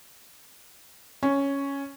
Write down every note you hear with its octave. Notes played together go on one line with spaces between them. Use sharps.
C#4